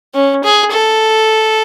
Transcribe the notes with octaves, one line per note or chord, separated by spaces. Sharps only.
C#4
G#4
A4